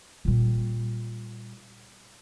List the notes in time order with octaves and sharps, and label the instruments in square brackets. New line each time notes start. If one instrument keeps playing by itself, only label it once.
[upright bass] A#2 G3